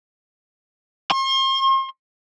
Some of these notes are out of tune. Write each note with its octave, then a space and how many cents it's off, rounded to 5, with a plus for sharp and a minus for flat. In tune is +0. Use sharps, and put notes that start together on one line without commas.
C6 +40